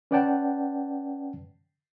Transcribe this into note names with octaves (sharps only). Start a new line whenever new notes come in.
C#4 B4 D5 F#5 G5 A5